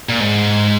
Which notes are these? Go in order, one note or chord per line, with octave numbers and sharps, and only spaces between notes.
A#2
G#2